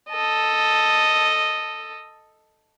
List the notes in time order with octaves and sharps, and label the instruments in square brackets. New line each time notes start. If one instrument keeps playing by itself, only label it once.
[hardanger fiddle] A4 D#5